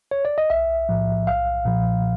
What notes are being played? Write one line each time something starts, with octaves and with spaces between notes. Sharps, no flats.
C#5
D5
D#5
B1 E5
A2 F3
B1 F5
A#2 F3